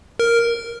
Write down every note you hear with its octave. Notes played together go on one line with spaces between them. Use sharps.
A#4